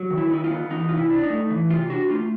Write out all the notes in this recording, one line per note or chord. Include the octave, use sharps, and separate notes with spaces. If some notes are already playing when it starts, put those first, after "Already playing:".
Already playing: F#3
D#3
E4
D#4 E4
F4
B3
E3 D#4
C3 F4
E4
D4
D#4
A3
E3
C3 F4
D4 F#4
A3 F4